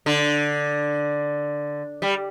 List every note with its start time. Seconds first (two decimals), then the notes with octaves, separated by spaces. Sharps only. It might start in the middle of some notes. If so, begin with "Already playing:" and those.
0.06 D3
2.02 G3